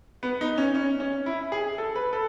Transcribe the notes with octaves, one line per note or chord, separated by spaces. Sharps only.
B3
D#4
C#4
C#4
C#4
E4
G#4
A4
B4
A4